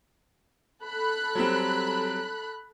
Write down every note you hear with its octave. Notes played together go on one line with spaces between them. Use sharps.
A4 B5 F#6
F#3 G3 C4